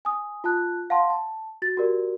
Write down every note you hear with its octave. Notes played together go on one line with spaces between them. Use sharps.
G#5 D#6
F4 A5 F#6
F5 F#5 A5 C6
A5
F#4 A6
F#4 G4 A#4 D5